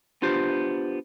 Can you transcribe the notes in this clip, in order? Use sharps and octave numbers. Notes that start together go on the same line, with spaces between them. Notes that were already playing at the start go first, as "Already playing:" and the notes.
B3 D4 F4 G4 C5